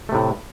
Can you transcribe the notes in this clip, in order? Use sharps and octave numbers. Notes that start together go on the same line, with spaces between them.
A2 C3 A3